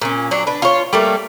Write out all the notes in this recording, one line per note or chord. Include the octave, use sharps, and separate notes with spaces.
A#2 C#4
F#3 D4
D4 B4
F4 C#5
G3 A3 A#3